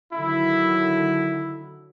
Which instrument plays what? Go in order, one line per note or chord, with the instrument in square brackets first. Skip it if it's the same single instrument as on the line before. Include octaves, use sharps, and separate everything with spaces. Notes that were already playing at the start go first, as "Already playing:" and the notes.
[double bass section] D3 D#3 F#3 [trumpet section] E4